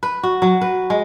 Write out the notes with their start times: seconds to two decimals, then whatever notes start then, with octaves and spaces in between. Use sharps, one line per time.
0.03 B4
0.23 F#4
0.42 F#3
0.61 B4
0.90 G#3